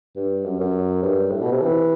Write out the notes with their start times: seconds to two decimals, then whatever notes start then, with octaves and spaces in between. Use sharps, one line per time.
0.16 G2
0.45 F#2
0.60 F#2
1.03 G2
1.32 A2
1.42 B2
1.52 C3
1.62 E3